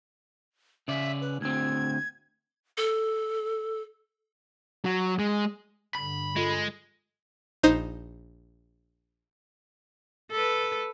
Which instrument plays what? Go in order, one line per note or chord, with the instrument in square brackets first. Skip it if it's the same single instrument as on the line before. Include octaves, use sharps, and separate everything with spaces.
[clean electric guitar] C#3 D5 [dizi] E5
[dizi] B4
[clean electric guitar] D2 C4 [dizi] G#6
[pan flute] A4
[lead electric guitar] F#3
G#3
[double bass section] G2 D3 [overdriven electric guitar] B5
[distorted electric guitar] G#3 [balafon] F4 A4
[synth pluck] A#1 D#4 C5 D#6
[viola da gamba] A4 B4